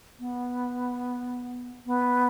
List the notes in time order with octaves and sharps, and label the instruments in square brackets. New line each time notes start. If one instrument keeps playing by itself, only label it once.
[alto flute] B3
B3